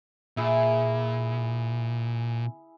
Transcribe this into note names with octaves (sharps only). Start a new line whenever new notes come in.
A#2 E4 G#4